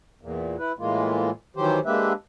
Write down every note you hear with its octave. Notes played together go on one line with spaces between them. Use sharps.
E2 A#2
E4 B4
A2 E3 G#3 A#3 F4
D#3 E3 F#3 G4 C5
G#3 A#3 D4 G4 B4 E5